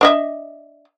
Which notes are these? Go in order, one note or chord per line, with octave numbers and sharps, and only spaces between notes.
D4 D#5 E5